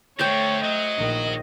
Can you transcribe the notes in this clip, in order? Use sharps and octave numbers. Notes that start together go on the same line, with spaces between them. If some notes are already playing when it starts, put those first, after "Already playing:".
D2 D3 A3 C5 C#5 G5
F#3 D#5
A#1 D#3